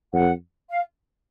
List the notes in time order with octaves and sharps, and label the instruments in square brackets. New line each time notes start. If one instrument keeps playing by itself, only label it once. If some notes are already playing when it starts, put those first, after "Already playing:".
[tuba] F2 [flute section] F#5
[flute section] F5